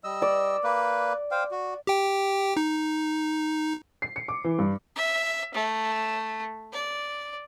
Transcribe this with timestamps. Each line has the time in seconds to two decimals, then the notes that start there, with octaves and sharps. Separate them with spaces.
0.04 G3 D#5 E6
0.22 D5
0.64 A#3 B4
1.31 C5 F5 G5
1.51 F#4
1.87 G4 G5
2.57 D#4
4.02 C7
4.16 C#7
4.28 D6
4.44 E3
4.59 G2
4.96 E5
5.54 A3
6.72 D5